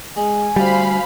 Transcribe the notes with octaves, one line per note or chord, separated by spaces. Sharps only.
G#3 G#5
D2 G3 C5 F5 B5